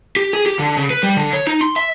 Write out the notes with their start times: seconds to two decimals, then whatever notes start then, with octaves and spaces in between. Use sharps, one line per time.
0.16 G4
0.33 G#4
0.46 G4
0.59 D3
0.77 C#3
0.90 B4
1.03 G3
1.17 D3
1.33 C#5
1.47 D#4
1.61 C6
1.76 E5